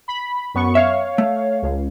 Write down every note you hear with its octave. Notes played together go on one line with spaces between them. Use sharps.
B5
F#2 B3 C#6
C#5 E5 F5
A3
C#2